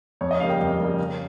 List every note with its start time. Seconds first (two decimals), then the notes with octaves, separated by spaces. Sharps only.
0.21 F2 C#5
0.31 D#5
0.40 C#3 G3 A#3 F5
0.50 G5
0.60 F2 F5
0.79 C#3 G3 A#3
0.98 C#3